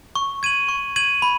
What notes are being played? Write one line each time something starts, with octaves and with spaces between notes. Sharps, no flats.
C#6
G#6 D#7 F#7
C#6
G#6 D#7 F#7
B5